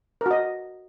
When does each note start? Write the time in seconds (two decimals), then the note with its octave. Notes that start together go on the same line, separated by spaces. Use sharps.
0.21 A#4
0.26 F#4
0.31 D#5